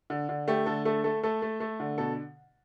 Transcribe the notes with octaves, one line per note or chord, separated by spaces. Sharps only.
D3
D3
A3 G4
D3 A4
A3 A4
A3 A4
A3 A4
A3
A3
D3
B2 A4